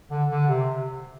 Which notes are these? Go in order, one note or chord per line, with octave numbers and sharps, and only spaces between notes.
D3
D3
C3